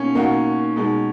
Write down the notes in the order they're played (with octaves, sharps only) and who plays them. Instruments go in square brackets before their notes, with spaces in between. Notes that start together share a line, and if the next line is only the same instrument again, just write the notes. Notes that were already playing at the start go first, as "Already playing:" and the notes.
Already playing: [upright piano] B2 A#3 D#4 [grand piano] C#4
[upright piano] B2 A#3 D#4 F#4
B2 G#3 D#4